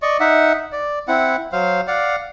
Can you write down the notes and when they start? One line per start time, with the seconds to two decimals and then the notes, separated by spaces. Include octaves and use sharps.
0.02 D5 D#5 C#6
0.20 D#4 E5 F#5
0.72 D5
1.08 C4 E4 F#5
1.52 F#3 C5 F5
1.87 D5 F5 F#5